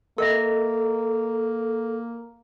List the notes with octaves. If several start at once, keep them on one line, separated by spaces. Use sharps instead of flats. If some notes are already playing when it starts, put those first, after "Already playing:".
A#3 A4 A#4 D#5 E5